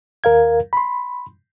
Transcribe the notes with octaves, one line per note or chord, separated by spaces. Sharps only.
D#2 A#4 F5 G#6
B5 C6